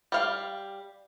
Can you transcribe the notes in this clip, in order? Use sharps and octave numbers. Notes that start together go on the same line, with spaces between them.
G3 F5